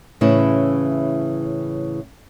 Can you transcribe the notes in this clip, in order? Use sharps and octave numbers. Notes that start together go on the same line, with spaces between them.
A2 C#3 E3 C#4 E4